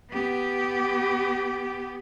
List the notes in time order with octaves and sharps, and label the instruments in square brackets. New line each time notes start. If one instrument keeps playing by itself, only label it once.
[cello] B3 G4